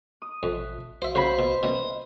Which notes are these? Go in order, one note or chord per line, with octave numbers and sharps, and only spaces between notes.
D#6
A1 F2 B2
B1 F#4 C5 E5 F5
C#3 F#3 C5 B5
B2
F#2 B2 D#5